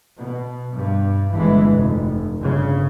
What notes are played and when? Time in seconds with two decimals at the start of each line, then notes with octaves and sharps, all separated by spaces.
0.16 B2
0.75 G2
1.34 G1 E3 G#3
1.72 F1
2.37 G1 C#3